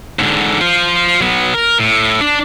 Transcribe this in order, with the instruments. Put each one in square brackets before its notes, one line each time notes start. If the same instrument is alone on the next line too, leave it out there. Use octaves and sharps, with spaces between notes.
[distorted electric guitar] G#2 D3
F4 C5
F#3 B3
A#4
A2
D4